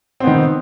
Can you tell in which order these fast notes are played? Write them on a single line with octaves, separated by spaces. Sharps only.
C4 B3 D#3